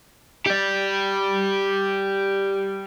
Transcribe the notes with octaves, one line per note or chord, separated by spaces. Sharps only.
G4 D5